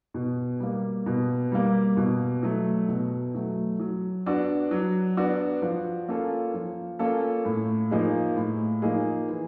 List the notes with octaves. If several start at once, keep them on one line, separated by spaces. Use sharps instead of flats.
B2
G3 A#3
B2
G3 A#3
B2
F#3 A3
B2
F#3 A3
F#3
B3 D4 F#4
F#3
B3 D4 F#4
F3
A#3 C#4 F4 A4
F3
A#3 C#4 F4 A4
A2
F3 A#3 D#4 G#4
A2
F3 A#3 D#4 G#4
E3